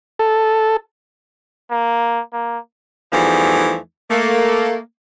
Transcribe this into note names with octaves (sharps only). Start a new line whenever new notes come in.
A4
A#3
A#3
E2 E3 F3 G3 A3 D#4
A3 A#3